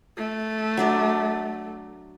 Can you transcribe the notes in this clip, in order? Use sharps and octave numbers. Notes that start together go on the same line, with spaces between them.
A3
F#3 D4 D5